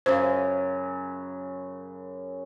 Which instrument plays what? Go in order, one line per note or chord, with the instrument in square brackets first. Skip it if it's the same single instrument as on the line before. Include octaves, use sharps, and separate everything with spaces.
[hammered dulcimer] F#2 C#3 [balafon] C5